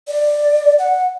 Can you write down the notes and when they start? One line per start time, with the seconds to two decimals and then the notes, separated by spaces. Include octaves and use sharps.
0.08 D5
0.79 F#5